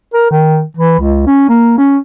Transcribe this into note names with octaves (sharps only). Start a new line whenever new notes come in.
A#4
D#3
E3
C#2
C#4
A#3
C#4